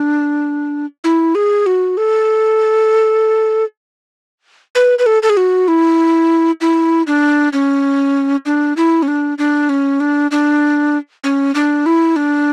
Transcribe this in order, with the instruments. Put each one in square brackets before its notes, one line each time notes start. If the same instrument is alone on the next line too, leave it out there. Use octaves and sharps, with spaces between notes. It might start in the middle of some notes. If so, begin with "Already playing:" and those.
Already playing: [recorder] D4
E4
G#4
F#4
A4
B4
B4
A4
A4
G#4
F#4
E4
E4
D4
C#4
D4
E4
C#4
D4
D4
C#4
D4
D4
C#4
D4
E4
D4